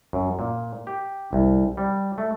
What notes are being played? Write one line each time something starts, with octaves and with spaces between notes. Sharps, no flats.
F#2
A#2
G4
C2
G3
A3